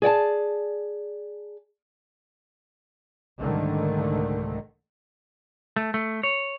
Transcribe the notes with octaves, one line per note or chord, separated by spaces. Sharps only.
G#4 D5 G5 A5
C2 G#2 D3 D#3 A3
A3
A3
C#5